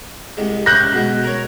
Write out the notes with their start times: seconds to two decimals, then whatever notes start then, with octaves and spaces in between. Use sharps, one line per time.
0.37 C2 G#3
0.66 C3 C#4 F#6 G6 A#6
0.93 B2 G#3
1.23 A#4 C#5